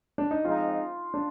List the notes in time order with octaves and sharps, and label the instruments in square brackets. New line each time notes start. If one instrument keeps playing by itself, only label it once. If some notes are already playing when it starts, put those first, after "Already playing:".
[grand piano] D4
D#4
[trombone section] F3 G#3 C4 D#4 [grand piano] F4
[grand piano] D4